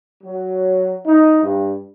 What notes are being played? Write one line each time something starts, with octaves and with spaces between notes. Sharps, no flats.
F#3
D#4
G2